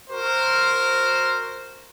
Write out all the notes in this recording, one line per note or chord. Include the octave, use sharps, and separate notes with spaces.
F#4 A#4 C5